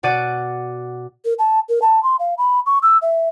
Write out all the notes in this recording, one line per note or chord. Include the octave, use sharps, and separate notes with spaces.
B2 F#4 D5 F#5 D7 D#7
A#4
A5
A#4
A5
C6
F5
B5
C#6
E6
E5